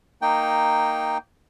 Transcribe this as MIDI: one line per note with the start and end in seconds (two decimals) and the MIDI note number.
0.22 1.18 58
0.22 1.18 63
0.22 1.18 79